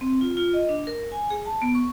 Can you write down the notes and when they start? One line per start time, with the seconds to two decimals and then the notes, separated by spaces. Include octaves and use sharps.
0.01 C4
0.21 F4
0.37 F4
0.53 D#5
0.69 D4
0.87 A#4
1.12 G#5
1.30 G#4
1.45 A5
1.62 B3
1.75 C#6